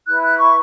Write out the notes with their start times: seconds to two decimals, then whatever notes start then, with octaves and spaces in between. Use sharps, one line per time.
0.06 E4 B4 F#6
0.22 F#6
0.38 C#6